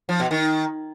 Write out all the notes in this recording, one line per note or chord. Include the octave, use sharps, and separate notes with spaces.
F3
B2
D#3